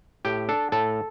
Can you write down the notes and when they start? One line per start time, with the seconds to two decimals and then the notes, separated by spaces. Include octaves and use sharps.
0.25 A2 G4 G5
0.49 D4 A4 A5
0.72 A2 A4 A5